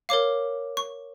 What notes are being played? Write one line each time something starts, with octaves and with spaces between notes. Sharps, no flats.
A#4 C#5 F5 D6
C#6